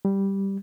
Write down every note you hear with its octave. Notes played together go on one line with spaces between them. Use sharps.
G3